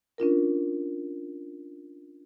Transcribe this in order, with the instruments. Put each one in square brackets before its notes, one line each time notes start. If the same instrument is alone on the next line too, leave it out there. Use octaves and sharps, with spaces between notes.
[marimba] C#4 D4 F4 A#4